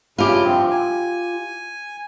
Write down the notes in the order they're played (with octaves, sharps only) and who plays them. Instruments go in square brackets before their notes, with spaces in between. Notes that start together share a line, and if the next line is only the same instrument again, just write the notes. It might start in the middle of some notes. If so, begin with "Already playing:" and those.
[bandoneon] G2 C#3 E4 [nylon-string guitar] F4 G4
[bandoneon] G2 F3 C4
G#5